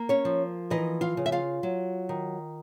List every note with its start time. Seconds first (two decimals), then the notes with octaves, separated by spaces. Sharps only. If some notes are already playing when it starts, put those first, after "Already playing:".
Already playing: A#3
0.09 C#4 C#5
0.25 F3
0.70 E3 D#4 D#5
1.01 F4 F5
1.17 C#3
1.26 E5
1.32 F4 F5
1.63 F#3
2.09 D#3